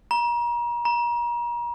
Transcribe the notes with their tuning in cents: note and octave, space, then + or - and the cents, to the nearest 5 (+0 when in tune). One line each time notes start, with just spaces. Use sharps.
A#5 +35
A#5 +35